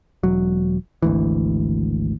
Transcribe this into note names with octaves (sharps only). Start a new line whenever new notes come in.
E1 F#3
G#1 D2 E3